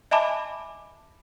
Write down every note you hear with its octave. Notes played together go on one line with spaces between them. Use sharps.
D#5 E5 G#5 A5 B5 D6